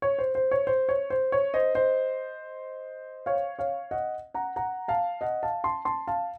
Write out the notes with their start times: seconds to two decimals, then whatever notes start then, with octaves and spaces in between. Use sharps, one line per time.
0.02 C#5
0.19 C5
0.35 C5
0.51 C#5
0.67 C5
0.89 C#5
1.10 C5
1.32 C#5
1.54 C5 D#5
1.75 C5 D#5
3.26 C#5 F5
3.59 C#5 F5
3.91 D#5 F#5
4.34 F#5 A#5
4.56 F#5 A#5
4.88 F5 A5
5.21 D#5 F#5
5.43 F5 A5
5.64 A5 C6
5.85 A5 C6
6.08 F5 A5